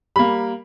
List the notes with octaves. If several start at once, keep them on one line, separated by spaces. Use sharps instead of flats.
G3 A#3 B5